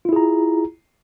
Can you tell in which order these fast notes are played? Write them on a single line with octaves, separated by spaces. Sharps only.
F4 E4 G#4 A#5